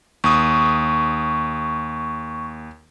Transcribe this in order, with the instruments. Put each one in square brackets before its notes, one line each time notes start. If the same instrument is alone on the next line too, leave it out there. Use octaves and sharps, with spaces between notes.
[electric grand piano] D#2 D#6 [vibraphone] C#6